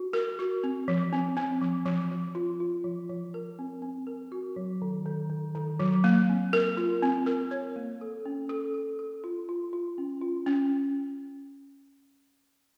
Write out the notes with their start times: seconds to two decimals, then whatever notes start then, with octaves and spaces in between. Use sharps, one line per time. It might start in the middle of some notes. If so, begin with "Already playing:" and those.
Already playing: F#4
0.13 A#4
0.39 F#4
0.64 C4
0.88 F3
1.13 C4
1.37 C4
1.62 F3
1.86 F3
2.11 F3
2.35 F4
2.60 F4
2.84 F3
3.10 F3
3.34 A#4
3.59 C4
3.82 C4
4.07 A#4
4.32 F#4
4.56 F#3
4.82 D#3
5.06 D#3
5.30 D#3
5.55 D#3
5.79 F#3
6.04 A#3
6.29 C4
6.53 A#4
6.77 F4
7.02 C4
7.26 A#4
7.51 C#5
7.76 A#3
8.01 A4
8.26 C#4
8.49 A4
8.74 A4
8.99 A4
9.24 F4
9.49 F4
9.73 F4
9.98 C#4
10.21 F4
10.47 C#4